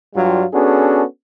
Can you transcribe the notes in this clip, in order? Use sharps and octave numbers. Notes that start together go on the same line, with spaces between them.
G2 F#3 G3 F4
B3 C#4 D4 F#4 G#4 A4